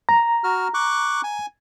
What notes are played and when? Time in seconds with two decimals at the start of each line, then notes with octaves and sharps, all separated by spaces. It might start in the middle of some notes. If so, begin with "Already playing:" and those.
0.09 A#5
0.44 F#4 F6
0.74 C#6 D6 F#6
1.24 G#5